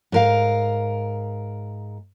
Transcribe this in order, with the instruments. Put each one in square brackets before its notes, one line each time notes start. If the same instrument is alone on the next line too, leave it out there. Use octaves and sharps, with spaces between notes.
[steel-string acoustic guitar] G#2 A#4 F5